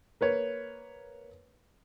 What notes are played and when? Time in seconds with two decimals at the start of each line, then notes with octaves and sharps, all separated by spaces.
0.21 A#3 B4 C#5